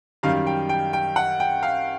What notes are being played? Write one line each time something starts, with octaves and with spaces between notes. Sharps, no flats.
F#2 D#3 G3 F5
G5
G5
G5
F#5
G5
F5